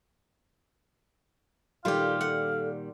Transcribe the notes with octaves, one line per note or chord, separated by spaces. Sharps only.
A#2 D#3 G3 F4 G4 A4 F5
A4 F#5